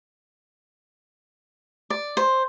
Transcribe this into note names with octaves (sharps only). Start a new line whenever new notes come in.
D5
C5